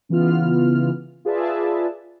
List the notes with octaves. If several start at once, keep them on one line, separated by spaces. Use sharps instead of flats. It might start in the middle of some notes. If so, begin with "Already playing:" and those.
C#3 E3 B3 F4 F6
F4 G#4 B4 D5 E5 A5